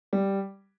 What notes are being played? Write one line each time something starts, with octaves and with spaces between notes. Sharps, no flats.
G3